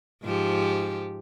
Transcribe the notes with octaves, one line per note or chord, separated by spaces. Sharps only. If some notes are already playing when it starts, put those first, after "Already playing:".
G#2 F3 G4